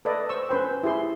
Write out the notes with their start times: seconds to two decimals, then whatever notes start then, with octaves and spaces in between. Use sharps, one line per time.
0.05 A4 B4 D5 D#5
0.29 C5 C#6 E6
0.49 C#4 B4 C5 G5
0.83 E4 G4 G#4 C6